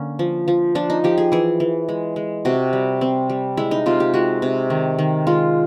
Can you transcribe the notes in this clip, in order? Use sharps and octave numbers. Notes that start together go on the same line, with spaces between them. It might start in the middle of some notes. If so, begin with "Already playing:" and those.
Already playing: D3 A#3 C#4
F3
F3
F3 D4
D#4
F3 G4
G#4
E3 G#4
E3
G#3
G#3
C3 F#4
G3
C4
G3
G#3 E4
D#4
C3 F4
G4
G#3 F#4
C3
D#3
D#3
G#3 F4